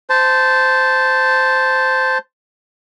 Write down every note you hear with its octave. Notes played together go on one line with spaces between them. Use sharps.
C5 A5